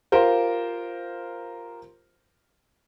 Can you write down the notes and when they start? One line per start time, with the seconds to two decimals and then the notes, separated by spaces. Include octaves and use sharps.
0.12 F4 G4 A#4 C5